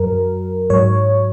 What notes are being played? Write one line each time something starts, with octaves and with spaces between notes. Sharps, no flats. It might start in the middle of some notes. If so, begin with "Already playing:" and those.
Already playing: F#2 F#3 A#4
G#2 F#3 C#5